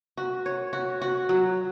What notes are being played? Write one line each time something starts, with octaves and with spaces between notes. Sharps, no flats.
F#4
C#5
F#4
F#4
F#3